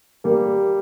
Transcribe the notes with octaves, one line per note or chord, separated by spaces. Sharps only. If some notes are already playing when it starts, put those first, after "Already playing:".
G3 A#3